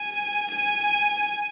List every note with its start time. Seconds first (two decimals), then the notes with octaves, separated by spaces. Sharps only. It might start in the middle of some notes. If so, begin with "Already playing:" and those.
Already playing: G#5
0.51 G#5